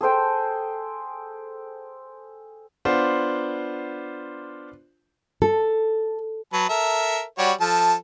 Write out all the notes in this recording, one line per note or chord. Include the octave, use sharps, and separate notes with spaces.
G#4 A4 C5 G5
B3 D4 F4 C5
A4
F#3 B4 A5
A4 A#4 E5
G3 F#4 C#5
F3 A4 A5